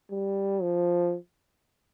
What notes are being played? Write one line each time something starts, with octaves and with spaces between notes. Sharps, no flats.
G3
F3